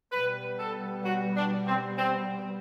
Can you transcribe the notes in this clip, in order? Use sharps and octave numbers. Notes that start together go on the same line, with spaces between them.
B2 G3 B3 B4
A4
F#4
D4
C4
C4